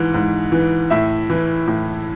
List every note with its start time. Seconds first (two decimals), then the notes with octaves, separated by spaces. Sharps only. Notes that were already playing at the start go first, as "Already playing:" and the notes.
Already playing: G#2 E3
0.14 G#2
0.52 E3
0.90 A2 E5
1.30 E3
1.67 A2